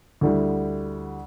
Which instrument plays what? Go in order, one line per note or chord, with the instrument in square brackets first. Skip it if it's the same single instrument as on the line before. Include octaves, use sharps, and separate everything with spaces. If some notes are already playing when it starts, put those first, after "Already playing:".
[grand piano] D2 D3 G3 E4